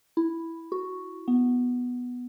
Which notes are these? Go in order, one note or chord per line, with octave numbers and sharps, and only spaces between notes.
E4
F#4
B3